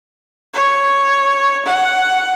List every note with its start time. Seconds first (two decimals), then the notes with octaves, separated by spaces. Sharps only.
0.54 C#5
1.65 F#5